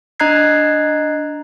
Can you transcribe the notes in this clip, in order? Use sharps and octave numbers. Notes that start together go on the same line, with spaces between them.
D4 D#5 A#5 F#6 G#6 C7